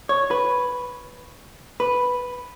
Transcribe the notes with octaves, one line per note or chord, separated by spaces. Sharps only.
C#5
B4
B4